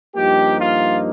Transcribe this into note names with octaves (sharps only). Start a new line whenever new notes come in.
G2 F3 A#3 D#4 G4
F4